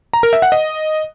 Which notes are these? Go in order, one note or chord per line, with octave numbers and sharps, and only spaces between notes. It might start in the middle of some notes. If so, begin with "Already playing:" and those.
A#5
A#4
E5
F#5
D#5